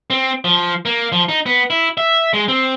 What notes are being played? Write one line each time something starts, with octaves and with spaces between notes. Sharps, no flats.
C4
F3
A#3
F3
D#4
B3
E4
E5
G#3
C4